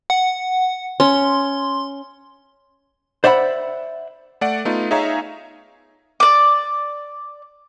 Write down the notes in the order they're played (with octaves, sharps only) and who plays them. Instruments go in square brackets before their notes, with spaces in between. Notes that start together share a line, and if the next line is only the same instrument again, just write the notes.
[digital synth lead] F#5
[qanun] C#4 [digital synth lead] C6
[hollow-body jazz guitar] C5 D5 E5 F#5 B5
[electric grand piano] A3 D5 F#5 D7
A3 B3 D#4 F4
D#4 G#4 C#5 E5 F5 A#5
[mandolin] D5 D6